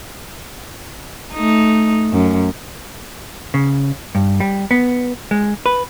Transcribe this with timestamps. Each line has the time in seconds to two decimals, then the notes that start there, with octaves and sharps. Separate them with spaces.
1.34 A3 D#4
2.12 F#2
3.54 C#3
4.15 G2
4.40 G3
4.71 B3
5.31 G#3
5.66 B4